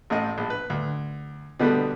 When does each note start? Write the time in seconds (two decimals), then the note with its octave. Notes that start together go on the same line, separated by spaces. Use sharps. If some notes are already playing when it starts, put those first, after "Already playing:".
0.10 A1 A2 D#5
0.38 A#1
0.50 B4
0.70 D2
1.60 B2 D3 G3 A3 B3